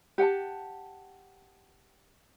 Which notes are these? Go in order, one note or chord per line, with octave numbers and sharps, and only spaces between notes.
G4 F#5 G5 A5